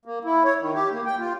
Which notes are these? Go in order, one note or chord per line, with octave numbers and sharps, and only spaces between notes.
A#3
E4
C#5
D#3
G4
A#3
G5
F4